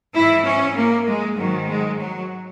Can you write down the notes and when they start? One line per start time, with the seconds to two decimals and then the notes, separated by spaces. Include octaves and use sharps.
0.15 G#2 E3 E4
0.47 C#4
0.76 A#3
1.08 G#3
1.37 G#2 D#3 F#3
1.69 G#3
1.99 F#3